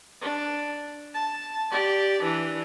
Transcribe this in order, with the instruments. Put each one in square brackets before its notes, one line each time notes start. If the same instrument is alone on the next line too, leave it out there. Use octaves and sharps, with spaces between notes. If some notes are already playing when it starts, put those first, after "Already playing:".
[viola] D4
A5
G4 D5
E3 D4